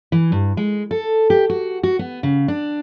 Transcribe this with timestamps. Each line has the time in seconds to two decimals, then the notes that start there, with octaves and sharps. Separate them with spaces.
0.12 E3
0.32 G2
0.57 G#3
0.91 A4
1.30 G4
1.50 F#4
1.83 F#4
1.99 B3
2.23 C#3
2.48 D4